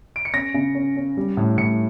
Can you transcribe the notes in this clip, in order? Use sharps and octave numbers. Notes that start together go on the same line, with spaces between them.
D7
C#7
C#4 A#6
C#3
C#4
C#4
G3
A2
A2 C#7